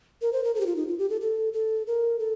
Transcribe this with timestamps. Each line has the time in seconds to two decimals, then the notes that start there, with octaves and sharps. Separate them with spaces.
0.22 A#4
0.33 C5
0.44 A#4
0.55 A4
0.60 G4
0.66 F4
0.76 D#4
0.88 F4
0.98 G4
1.10 A4
1.21 A4
1.53 A4
1.87 A#4
2.19 A4